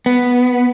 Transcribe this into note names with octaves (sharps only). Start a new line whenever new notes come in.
B3